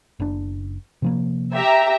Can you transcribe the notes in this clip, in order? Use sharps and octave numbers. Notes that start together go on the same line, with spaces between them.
F#1 D4
C3 F3 A#3
G4 E5 A#5